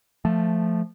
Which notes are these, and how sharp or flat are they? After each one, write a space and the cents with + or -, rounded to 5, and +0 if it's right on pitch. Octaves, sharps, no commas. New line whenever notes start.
F3 +0 A3 +0